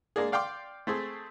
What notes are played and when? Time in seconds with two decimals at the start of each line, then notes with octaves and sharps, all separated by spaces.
0.16 G#3 A#3 D4 G#4
0.32 D5 F5 G5 C6 D6
0.87 A3 C4 G#4